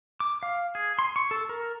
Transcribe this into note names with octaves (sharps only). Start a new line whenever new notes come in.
D6
F5
G#4
C6
C#6
A4
A#4